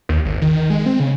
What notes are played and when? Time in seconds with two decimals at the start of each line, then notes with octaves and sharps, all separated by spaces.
0.09 D#2
0.25 G#1
0.42 D#3
0.56 D#3
0.70 G#3
0.86 C4
1.00 C#3